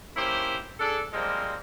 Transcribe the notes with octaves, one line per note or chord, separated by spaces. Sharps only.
A#3 C#4 E4 G4 C5
D4 G#4 A4
F3 G3 G#3 A#3 C4